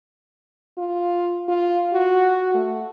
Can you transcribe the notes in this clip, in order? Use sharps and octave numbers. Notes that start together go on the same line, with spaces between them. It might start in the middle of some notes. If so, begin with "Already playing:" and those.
F4
F4
F#4
A3